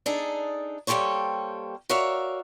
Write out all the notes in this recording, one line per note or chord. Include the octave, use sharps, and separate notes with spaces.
D4 D#4 G#4 A4
G3 A#3 G4 A4 C5 C#5
F#4 A#4 C#5 D5 E5 F5